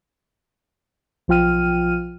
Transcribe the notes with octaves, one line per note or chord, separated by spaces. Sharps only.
B1 F3 F4 G5 F6 D#7